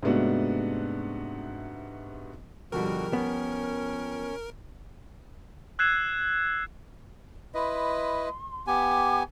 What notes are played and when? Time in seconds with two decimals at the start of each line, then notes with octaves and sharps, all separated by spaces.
0.03 G#2 C3 A3 B3 D4 F#4
2.72 F2 B2 D3 G3 F#4 A#4
3.13 B3 C#4
5.79 E6 F#6 G#6 C7 E7
7.54 E4 B4 D#5 C6
8.67 B3 G4 G#5 D6